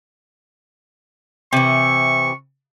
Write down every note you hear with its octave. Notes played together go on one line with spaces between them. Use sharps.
C3 E3 C#6